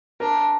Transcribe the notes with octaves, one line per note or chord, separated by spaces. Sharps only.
D4 A#4